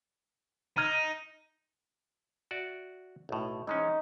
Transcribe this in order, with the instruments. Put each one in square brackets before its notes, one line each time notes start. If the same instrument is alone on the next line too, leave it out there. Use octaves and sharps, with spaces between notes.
[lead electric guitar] D#4 [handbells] A#5 F6 G#6
[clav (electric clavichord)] F#4 D5 E5
B1 A2
[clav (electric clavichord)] E3 G#3 C#4 [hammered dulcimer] D#4